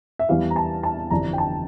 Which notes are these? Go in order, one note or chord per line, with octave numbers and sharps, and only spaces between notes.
E5
E2 E3 G3 F5
A#5
A5
A5
G1 F2 E3 G3 D4 A#5
G5
A5